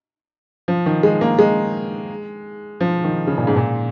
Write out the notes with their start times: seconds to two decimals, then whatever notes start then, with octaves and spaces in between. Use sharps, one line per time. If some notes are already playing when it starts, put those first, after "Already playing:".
0.68 F3
0.86 D#3
1.03 G#3
1.21 A#3
1.39 G#3
2.81 F3
3.04 D#3
3.27 C#3
3.38 A#2
3.47 G#2
3.56 A#2